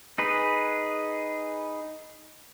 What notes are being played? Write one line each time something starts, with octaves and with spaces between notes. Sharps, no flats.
D#4 G#4 B4